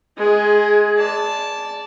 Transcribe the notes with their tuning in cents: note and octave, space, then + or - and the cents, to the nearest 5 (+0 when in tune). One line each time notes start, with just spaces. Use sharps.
G#3 +20 G#4 +0
D5 -15 A5 +0